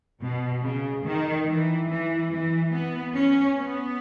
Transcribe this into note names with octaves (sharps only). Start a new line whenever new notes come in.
B2
C#3
D#3
E3
E3
E3
B3
C#4
B3